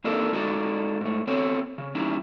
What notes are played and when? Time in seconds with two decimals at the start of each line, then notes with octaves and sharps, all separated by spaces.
0.04 A#3 C4 D4 D#4 A4 A#4
0.32 G#3 D#4 F#4 A4 C#5 D5
1.01 G#2 A3
1.27 B3 C4 A4 C#5
1.78 C#3
1.95 G3 C#4 D#4 E4